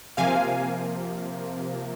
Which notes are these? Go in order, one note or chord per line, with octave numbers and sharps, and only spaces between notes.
C3 F3 A#3 F5 G#5